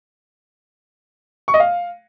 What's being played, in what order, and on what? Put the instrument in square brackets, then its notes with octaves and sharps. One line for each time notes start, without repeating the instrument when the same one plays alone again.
[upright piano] C#6
D#5
F5